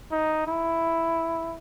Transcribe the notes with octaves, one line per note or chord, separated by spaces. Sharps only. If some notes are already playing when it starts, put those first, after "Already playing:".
D#4
E4